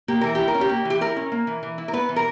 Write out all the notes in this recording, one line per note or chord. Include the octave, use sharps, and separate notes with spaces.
A#3 G4
E3 A#4
E4 G4
A#4
C#4
G4
A#3
E3
G4
E4 A#4
C#4
A#3
E3
E3
E4
A#4
B3 B4
E3
A#4